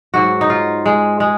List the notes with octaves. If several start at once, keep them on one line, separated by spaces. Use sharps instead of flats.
G#2 F#3 F#4
D#4
F4
G#3
G#3